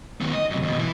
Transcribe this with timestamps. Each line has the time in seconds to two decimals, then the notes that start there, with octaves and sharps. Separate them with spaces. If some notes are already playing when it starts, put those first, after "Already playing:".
0.21 D#3 B3
0.33 D#5
0.50 F#2 C3
0.63 D#2 B2
0.79 E3 E4